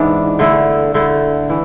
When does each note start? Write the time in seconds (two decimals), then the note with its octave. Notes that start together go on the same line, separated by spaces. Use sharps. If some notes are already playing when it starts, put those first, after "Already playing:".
Already playing: G#2 E3 B3 D4
0.39 D3 A3 E4
0.94 D3 A3 E4
1.50 E3